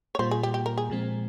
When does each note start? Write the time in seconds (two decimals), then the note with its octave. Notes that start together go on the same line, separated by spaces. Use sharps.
0.15 C#5
0.19 A#2 G3 A#3 F4 C5
0.31 G#4
0.43 G4
0.54 G4
0.66 A#4
0.78 G#4
0.90 A#2 F3 G#3 C4